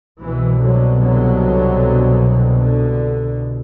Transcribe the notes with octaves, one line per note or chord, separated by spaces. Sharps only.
C2 B2 E3
D3 F#3
D3 F#3
D3